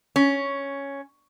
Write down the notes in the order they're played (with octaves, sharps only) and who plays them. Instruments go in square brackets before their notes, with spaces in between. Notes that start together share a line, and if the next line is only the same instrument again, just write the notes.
[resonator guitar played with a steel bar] C#4